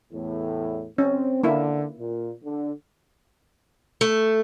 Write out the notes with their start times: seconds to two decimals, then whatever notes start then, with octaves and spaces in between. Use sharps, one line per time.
0.12 E2 A2
0.98 C4 C#4
1.43 D3 A#3 E4 E5
1.99 A#2
2.43 D3
4.01 A3